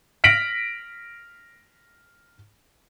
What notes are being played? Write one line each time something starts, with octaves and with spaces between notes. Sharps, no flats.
F6 A#6 B6 D7 F#7